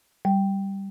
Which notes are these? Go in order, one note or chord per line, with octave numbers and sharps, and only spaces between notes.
G3